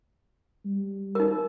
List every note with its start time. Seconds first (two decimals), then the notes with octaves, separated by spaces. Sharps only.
0.65 G3
1.15 D#4 A#4